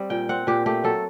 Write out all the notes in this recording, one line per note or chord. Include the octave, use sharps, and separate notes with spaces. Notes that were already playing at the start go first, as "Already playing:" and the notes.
Already playing: G3 C4
A#2 G5
C4 F#5
A#2 G4
A3 G4
F#3 A4